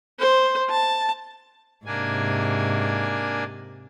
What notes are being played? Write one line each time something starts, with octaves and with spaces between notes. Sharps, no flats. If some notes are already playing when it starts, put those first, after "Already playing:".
C5
A5
G#2 C3 A#3 D4 G#5